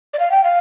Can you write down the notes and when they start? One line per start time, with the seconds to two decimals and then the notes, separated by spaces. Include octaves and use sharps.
0.14 D5
0.19 F5
0.31 G5
0.44 F5